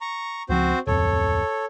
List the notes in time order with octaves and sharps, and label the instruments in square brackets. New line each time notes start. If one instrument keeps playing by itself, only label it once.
[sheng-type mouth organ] A#5 C#6
[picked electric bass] C#2 F3 [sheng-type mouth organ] C4 F#4 C5
[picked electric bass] D1 F2 [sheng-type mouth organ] A4 C#5